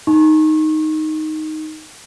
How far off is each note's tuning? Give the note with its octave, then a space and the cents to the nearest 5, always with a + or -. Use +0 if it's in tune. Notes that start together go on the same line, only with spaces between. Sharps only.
D#4 +0 C#6 -35